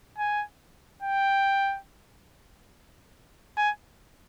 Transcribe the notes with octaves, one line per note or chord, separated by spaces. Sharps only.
G#5
G5
G#5